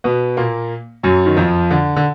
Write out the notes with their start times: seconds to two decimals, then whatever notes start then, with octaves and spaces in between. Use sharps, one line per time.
0.04 B2 B3
0.37 A#2 A#3
1.03 F#2 F#3
1.26 D#3
1.37 F2 F3
1.70 D3
1.96 D3